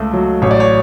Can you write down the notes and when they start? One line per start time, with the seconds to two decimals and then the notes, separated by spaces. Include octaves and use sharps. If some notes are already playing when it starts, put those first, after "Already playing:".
Already playing: C#2 A3
0.13 F#3
0.42 A1 C#5
0.51 D5
0.60 C#5